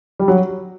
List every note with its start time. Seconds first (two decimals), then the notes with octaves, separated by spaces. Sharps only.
0.19 G3
0.28 F#3